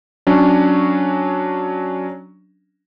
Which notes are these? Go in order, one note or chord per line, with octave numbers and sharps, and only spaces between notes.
F#3 C#4 D4